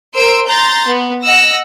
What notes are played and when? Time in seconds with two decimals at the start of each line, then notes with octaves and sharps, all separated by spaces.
0.15 A#4 C5 C6 E6 D7
0.47 A#5 C6 G6 A6 A#6
0.87 B3
1.23 D#5 F#5 E6 A#6